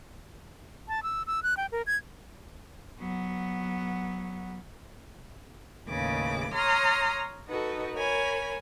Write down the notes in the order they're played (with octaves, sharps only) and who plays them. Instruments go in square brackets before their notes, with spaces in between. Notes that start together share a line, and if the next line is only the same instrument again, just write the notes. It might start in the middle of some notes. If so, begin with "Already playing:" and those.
[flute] A5
E6
E6
F#6
G5
A#4
G#6
[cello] F#3 B3
[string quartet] D#2 A2 C#3 B4 D6
C#5 A#5 C6 D#6 F6
D#4 F#4 A4 B4
A#4 C#5 G#5 B5